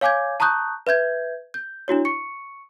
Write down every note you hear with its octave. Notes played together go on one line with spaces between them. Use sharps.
C#5 F5 G#5 D6 G6 G#6
A5 A#5 C#6 D#6 F#6 G6
B4 E5 G6 G#6
G6
D4 E4 F#4 C#5
C#6 C#7